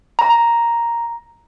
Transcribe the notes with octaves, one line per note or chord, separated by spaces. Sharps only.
A#5